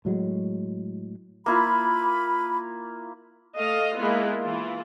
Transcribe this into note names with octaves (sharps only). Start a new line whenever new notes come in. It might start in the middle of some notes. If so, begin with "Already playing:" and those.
A2 F#3 G#3
A#3 E4 F4 B5
A3 A4 D#5 F5
G#3 A#3 B3 E4 F4
E3 E4 F4